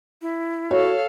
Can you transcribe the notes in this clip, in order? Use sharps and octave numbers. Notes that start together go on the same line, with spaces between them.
E4
F#4 A4 C#5 F5